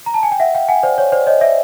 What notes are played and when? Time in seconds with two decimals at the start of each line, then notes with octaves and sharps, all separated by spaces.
0.06 A#5
0.14 A5
0.23 G#5
0.32 G5
0.40 E5 F#5
0.55 F5 G5
0.68 F#5 G#5
0.83 C5 D5
0.98 C#5
1.12 C5 D5
1.27 C#5 D#5
1.41 D5 E5